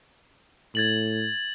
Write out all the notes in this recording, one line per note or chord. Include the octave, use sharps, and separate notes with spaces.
A2 G#6 A6 F#7